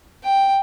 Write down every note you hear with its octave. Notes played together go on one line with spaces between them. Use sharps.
G5